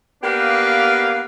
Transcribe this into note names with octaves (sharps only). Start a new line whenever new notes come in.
A#3 B3 D4 G4 B4 F5